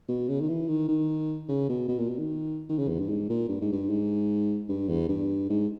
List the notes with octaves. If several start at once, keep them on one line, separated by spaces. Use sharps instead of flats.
B2
C#3
D#3
E3
D#3
D#3
C#3
B2
B2
A#2
B2
D#3
D#3
C#3
E2
G2
G#2
A#2
G2
G#2
G2
G#2
G2
E2
G2
G#2